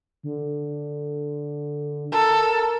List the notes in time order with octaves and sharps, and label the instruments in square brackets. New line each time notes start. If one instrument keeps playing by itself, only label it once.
[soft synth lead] D3
[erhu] A4 [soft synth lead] A#4